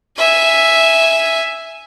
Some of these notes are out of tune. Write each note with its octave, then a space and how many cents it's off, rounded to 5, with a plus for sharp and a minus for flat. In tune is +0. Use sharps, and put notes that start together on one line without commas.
E5 +0 G#5 +0